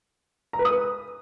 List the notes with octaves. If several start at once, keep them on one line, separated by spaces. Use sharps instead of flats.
A#5
B4
D#6
B4